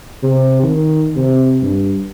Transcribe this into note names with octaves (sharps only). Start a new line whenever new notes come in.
C3
D#3
C3
G2